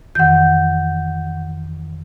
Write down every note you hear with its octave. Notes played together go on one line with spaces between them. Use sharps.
F2 D#3 E3 F#5 G6